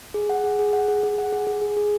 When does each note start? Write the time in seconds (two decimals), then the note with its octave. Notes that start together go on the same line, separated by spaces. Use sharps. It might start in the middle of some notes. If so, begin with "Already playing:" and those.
0.14 G#4
0.30 F#5
0.44 G#4
0.59 G#4
0.73 F#5
0.88 G#4
1.03 G#4
1.18 F#5
1.32 G#4
1.47 G#4
1.62 G#4
1.77 G#4